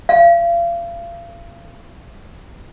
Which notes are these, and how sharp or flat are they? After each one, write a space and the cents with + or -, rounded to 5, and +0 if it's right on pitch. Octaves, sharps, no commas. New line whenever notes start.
F5 -35